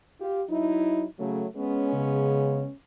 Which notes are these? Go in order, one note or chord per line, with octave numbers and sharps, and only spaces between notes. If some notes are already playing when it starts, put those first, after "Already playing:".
F4 G4
F#3 D#4 E4
C#3 F#3 A3
G#3 B3 C#4
C#3